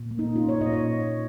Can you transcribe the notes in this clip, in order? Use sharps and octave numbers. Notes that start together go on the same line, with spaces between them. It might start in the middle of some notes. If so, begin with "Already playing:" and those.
Already playing: A#2
A#3
D#4
C#4 F4
C#5
A#2 D#5
C#5